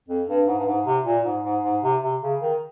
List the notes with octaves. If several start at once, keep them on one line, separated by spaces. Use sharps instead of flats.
F2
G2
G#2
G2
G#2
C3
A#2
G#2
G#2
G#2
C3
C3
C#3
D#3